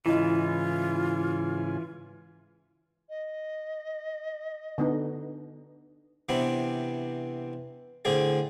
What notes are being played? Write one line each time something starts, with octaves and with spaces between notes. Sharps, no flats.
G#2 C#3 E3 E4 F4 D#5 G#5
D#5
D3 B3 D#4
C3 E3 B3 C4 D4
A2 D3 C4 G#4 D5